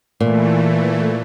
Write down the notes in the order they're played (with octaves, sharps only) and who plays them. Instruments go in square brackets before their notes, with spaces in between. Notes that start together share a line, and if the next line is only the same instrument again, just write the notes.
[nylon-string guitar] A#2 [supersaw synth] E3 A3